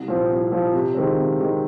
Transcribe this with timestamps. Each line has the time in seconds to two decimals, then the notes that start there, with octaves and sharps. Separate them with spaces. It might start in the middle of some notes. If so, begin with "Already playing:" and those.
Already playing: C2
0.08 A#2 F3 C4
0.30 C2
0.52 A#2 F3 C4
0.73 C3
0.95 D#3 G#3 C4
1.17 C3
1.38 D#3 G#3 C4